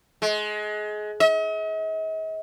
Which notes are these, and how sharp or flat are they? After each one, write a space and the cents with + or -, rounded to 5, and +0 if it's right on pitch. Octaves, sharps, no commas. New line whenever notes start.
G#3 +25
D#5 +45